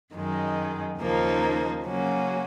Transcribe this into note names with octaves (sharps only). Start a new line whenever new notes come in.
F#2 D#3 G#3
D#2 C#3 F3 A#3 D#4
C#3 F#3 A#3 C#4 F#4